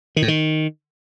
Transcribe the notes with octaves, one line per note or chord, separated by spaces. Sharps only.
D#3
A2
D#3